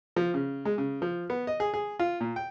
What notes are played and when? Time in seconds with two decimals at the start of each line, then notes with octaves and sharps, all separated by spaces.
0.16 F3
0.34 C#3
0.65 G#3
0.78 C#3
1.02 F3
1.30 B3
1.47 D#5
1.60 G#4
1.74 G#4
1.99 F4
2.21 A#2
2.36 G5